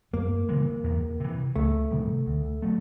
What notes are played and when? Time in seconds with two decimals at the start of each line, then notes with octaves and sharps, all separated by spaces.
0.13 F#2 A#3
0.49 C#3 E3 G#3
0.84 E2
1.20 C3 E3
1.56 C#2 A3
1.91 C3 D#3 G3
2.26 D2
2.62 F#3 A3